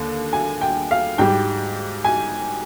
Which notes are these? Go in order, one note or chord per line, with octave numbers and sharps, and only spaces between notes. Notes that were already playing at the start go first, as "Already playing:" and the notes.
Already playing: D#2 D3
G#5
G5
F5
G#2 G3 G5
G#5